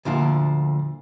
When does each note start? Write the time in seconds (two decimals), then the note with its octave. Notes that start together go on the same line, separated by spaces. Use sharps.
0.05 D2 A#2 D3 F3